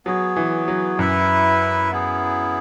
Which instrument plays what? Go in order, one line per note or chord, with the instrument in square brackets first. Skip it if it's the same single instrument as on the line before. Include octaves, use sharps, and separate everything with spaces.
[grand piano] F#3 [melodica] B3 G#4 C#5
[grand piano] E3
F#3
[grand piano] F#2 [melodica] E4 B4 E5
[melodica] B3 E4 G#4